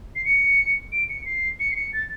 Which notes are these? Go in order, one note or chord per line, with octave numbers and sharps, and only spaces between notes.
C7
C#7
D7
C#7
C7
C#7
C7
C#7
A6